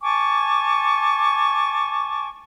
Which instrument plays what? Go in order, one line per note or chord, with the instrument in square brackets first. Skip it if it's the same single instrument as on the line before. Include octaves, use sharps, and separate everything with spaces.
[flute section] G#5 A5 C#6 D6